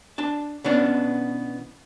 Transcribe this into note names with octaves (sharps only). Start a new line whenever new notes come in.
D4 A5
B2 E3 B3 C#4 D4